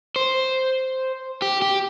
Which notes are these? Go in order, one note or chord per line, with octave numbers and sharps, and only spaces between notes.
C5
G4
G4